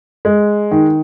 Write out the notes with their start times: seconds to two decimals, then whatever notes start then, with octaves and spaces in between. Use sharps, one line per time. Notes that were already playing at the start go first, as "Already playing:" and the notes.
0.25 G#3
0.71 D#3